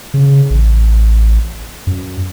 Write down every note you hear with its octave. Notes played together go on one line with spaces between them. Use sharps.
C#3
A1
F#2